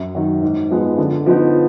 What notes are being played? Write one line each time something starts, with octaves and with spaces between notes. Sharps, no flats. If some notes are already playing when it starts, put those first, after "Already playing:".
Already playing: F#2
D#3 F#3
G#2
F3 G#3 B3
D3
F3 B3 D#4